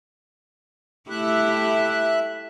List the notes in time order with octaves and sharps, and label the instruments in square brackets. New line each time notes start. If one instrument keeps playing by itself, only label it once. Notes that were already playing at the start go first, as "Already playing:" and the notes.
[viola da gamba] A3 E4 G4 [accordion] E5 F#6